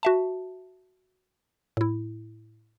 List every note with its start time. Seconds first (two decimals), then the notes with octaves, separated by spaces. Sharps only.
0.03 F#4 E5 A5
1.77 A2 E4